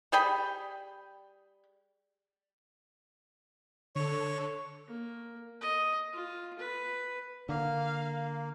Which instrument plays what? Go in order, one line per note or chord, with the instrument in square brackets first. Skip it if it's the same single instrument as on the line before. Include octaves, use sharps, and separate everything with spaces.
[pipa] G3 G#4 G5 B5
[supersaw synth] D3 A4 [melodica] C#5
[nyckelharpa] A#3
D#5
F4
B4
[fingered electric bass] D3 [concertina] A#3 [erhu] F5